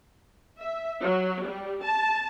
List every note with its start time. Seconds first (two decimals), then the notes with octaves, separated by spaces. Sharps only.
0.60 E5
1.03 F#3
1.45 G3
1.83 A5